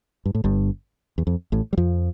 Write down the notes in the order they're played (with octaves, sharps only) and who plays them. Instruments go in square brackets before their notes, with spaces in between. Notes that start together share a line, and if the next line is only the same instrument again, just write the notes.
[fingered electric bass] G2
A2
G1 G2
E2
F2
A1 A2
G3
F2 F3